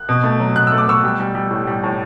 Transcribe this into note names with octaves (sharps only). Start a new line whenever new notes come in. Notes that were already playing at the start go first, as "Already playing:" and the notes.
Already playing: F#6
B2
A3
F#3
B2 F#6
E6
A3
D6
B2 C#6 E6
G3
G3
G3
A2
G3
A2